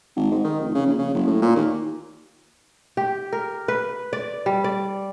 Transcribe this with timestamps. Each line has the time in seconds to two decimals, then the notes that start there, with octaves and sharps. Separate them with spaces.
0.16 G#1
0.31 G#2
0.44 D#3
0.60 F1
0.75 C#3
0.87 A#1
0.99 C#3
1.14 F#1
1.27 A2
1.42 A#2
1.56 D#2
2.97 G4
3.33 A#4
3.68 B4
4.13 D5
4.46 G3
4.64 D5